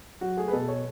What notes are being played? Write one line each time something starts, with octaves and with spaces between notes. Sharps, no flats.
F#3 F#4
A3 G#4
B4
B2 A4
C#5